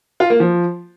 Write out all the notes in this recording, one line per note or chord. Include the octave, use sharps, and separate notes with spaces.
F4
A#3
F3